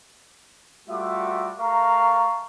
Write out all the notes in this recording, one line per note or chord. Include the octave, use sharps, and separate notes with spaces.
G3 A3 F4 F#4 E5 D6
A3 A#4 F5 A#5 C#6